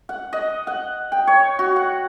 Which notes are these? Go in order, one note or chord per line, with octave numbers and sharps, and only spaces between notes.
F#5
D#5
F#5
G5
C#5
F#4
F#5